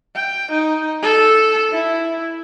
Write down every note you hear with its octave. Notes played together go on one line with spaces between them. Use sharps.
G5
D#4
A4
E4